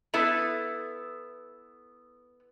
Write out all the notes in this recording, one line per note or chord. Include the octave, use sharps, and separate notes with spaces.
B3 E4 A4 B4